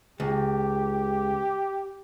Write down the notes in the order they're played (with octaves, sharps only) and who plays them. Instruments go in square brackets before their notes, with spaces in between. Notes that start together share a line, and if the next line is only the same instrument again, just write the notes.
[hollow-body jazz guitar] C#2 [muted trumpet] G4